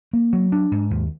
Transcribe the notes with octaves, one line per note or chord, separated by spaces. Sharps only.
A#3
F#3
D4
G#2
D#2